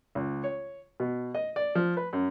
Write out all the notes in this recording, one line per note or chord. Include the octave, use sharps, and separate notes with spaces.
C#2
C#5
B2
D#5
D5
F3
B4
F#2